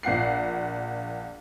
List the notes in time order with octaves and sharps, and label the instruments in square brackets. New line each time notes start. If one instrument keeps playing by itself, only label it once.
[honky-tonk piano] A#1 F4 F#5 C7